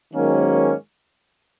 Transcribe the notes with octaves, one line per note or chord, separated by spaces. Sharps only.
G#2 D#3 F#3 A#3 C#4